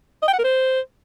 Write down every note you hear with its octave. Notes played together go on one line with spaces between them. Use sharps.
D#5
G5
F#5
A#4
C5